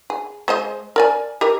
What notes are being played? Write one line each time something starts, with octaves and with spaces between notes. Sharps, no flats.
G#4
G#3 C5 D#5
A#4 D5 G#5
G4 A#4 D#5